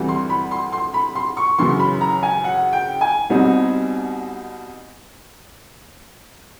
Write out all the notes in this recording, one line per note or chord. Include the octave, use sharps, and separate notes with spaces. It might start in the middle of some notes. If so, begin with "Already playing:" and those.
Already playing: D2 C3 E3 G3
C6
B5
C6
C6
B5
C6
C#6
F#2 C#3 E3 C6
B5
A#5
G#5
F#5
G5
G#5
C2 B2 G3 C4 D#4